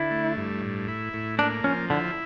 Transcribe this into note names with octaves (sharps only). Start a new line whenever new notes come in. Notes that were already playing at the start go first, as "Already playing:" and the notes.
Already playing: D3 E4
A3
G2
A2
E4
A2
A#3 D4
F3 C#4
D3 E4